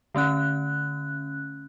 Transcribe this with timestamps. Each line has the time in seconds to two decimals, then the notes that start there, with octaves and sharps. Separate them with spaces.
0.15 D3 A3 C#4 F#6